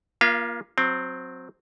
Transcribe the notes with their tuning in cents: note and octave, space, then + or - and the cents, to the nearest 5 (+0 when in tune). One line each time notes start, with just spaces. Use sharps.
A#3 +25 F4 -5 F5 -40
F#3 -20 C4 +0